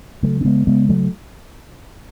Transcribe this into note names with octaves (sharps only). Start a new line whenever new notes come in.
C#3 F#3 A3
C#4
C#3 G#3 B3
C#3 G#3 B3
F#3 A3